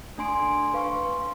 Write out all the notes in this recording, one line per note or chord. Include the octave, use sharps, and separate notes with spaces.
A3 D4 G#5 C6 D7
B4 F5 C6 C#6